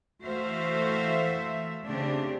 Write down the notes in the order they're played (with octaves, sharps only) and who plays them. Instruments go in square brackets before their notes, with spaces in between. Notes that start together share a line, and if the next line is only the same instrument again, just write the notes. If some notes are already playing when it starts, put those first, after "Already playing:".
[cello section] E3 A3 F#4 C5 E5 F5
C#3 A3 C4 D4 G4